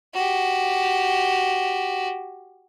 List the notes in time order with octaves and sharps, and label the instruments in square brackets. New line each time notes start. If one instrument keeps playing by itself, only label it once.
[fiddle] F#4 G4